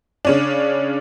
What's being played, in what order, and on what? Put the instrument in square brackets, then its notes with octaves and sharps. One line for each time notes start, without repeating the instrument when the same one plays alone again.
[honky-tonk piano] C#3 C#4 D4